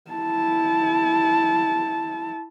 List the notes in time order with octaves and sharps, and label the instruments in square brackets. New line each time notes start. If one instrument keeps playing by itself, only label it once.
[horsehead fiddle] E4 A5